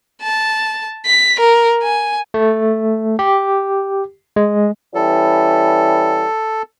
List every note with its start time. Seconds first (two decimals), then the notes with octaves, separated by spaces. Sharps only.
0.22 A5
1.06 B6
1.40 A#4
1.82 G#5
2.34 A3
3.19 G4
4.36 G#3
4.95 E3 G3 C#4 A4